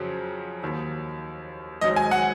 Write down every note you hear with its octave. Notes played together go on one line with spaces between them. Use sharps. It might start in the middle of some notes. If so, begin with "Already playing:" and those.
Already playing: F2 C#3 F#3
D#2 D#3 F#3
G#1 G#2 F#3 D#5
G#5
F#5